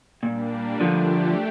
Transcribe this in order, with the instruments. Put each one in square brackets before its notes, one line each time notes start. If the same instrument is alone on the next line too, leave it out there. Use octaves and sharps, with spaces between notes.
[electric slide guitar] A#2 [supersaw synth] G3 A#3 D4
[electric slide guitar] D3 F3 [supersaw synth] A3 D4 G4